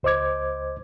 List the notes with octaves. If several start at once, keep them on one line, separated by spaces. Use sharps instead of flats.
C#2 C5 D#5 D6 G#6